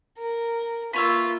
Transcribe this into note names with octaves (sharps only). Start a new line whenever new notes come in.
A#4
A#3 F4 B4 C#5 E5